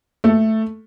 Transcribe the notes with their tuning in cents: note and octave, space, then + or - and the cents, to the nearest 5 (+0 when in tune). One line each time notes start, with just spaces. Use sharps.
A3 +0 A4 +0